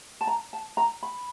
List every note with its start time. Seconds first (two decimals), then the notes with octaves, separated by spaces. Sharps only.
0.21 A5
0.27 A#5
0.53 A5
0.77 A#5
1.03 B5